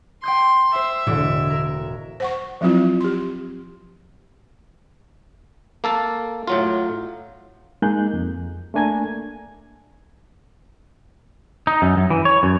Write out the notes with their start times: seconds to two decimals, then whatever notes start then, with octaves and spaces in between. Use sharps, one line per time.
0.23 G5 C6 D#6 G6
0.75 C5 E5
1.07 E1 A2 D3 D6
1.50 A#4
2.20 C5 F#5 C#6
2.61 F3 F#3 C4 E4 F4
3.01 G4 C6
5.84 A#3 A4 A5
6.47 A2 F#3 F4
7.82 G#3 A#3 D#4 G#4 F#6 G6
8.14 F2
8.74 A3 A#3 D4 G#5 A#5 G#6
11.67 D#4
11.82 F#2
11.97 F#2
12.10 E3
12.25 C#5
12.43 F#2